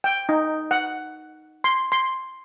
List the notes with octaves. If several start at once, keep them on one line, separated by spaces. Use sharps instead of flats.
G5
D#4
F#5
C6
C6